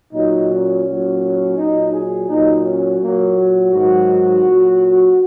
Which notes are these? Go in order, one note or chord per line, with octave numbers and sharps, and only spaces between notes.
A#2 F#3 D#4
C#4
A#2 F#3
A#2 F#3 D#4
G#4
A#2 F#3 D#4
C#4
A#2 F#3 A#3
F#4
G#2 D#3 F#3 F#4
A#2 F#3